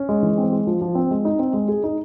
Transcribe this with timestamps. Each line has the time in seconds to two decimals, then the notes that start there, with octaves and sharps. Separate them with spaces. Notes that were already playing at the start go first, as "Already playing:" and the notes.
Already playing: C#4
0.09 G#3
0.23 E3
0.38 C4
0.52 G#3
0.67 F3
0.82 F3
0.95 C4
1.11 G#3
1.25 D#4
1.39 C4
1.53 G#3
1.68 G#4
1.84 D#4